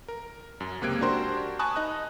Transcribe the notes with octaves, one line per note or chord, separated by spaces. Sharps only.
A#4
F#2
C#2 C3 A#3 F#6 G#6 D7
D4 F#4 G4 A#4 C5 C6
G#5 A5 B5 C#6 D#6 F#6
D#4 D#5 F#6